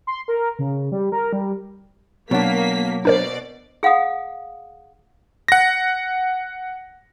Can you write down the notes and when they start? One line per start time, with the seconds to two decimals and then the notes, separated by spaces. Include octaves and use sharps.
0.07 C6
0.28 A#4
0.59 C#3
0.92 G3
1.12 A#4
1.33 G3
2.31 B2 F#3 A#3 D4 C#5 F#5 B6
3.05 B2 D4 A#4 C5 D5
3.83 G#4 F5 F#5 D#6
5.48 F#5 A#6